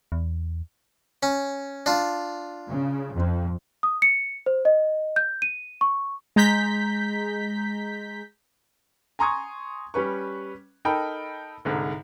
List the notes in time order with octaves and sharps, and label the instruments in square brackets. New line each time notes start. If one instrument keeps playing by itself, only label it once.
[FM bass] E2
[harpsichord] C#4
D4 F4
[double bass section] C#3
F2
[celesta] D#6
C#7
C5
D#5
G6
D#7
C#6
[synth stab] G#3 A#5 G6 B6
[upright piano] G#5 A#5 C6 C#6 D#6 G#6
G3 C#4 B4 C#6
D#4 A4 A#4 G5 A5 B5
C2 G#2 D3